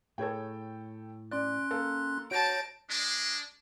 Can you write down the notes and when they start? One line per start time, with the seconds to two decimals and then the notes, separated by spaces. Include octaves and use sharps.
0.18 A2 G#4 A4 C#5 G5
1.31 C#4 D5 C6 F#6
1.70 A#3 A4 F5
2.31 F#4 C#5 A5 G6 A#6 D7
2.89 G#3 D4